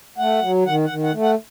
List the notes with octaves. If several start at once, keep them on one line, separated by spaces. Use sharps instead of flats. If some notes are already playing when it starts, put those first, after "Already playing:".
A3 F#5
F#3
D#3 F#5
F#5
D#3
F#5
A3
F#5